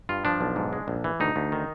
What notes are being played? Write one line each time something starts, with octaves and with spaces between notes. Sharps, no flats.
G2 F4
F3 D4
B1
G#2
G#3
A#1
E3
D2 D#4
D2
D#3